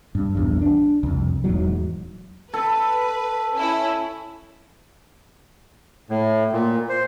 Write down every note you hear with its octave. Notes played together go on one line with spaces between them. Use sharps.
G2
A#1 E2 G2
D4
C2 F2
D#1 E2 G#2 F#3
A4 B4
C#4 E4
A2
A#2
C5